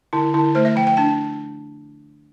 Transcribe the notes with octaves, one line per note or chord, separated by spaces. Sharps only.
D3 E4
D3 E4
A3 C5
E5
F3 G5
G5
D4 A5